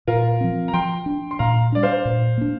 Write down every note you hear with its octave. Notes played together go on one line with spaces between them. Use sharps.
A#2 F4 A#4
F3 C4
A#5
F3 G5 C6
D4
C6
A#2 F5 A#5
G3 D4 D5
C5 F5
A#2
A#3 D4